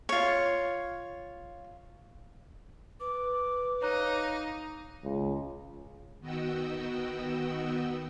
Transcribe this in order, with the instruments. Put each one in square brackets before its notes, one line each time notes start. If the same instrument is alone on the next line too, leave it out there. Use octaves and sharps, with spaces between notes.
[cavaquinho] F4 C#5
[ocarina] B4 [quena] D6
[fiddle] D#4 F5 [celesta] C#5 A#5 F#6
[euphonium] C#2
[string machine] D#3 B3 F#4 D#5 G5 E6